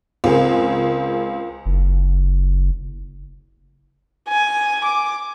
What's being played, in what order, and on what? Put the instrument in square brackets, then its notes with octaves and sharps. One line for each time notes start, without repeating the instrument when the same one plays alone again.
[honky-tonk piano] C#2 C4 G#4 A#4
[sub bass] F#1
[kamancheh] G#5
D6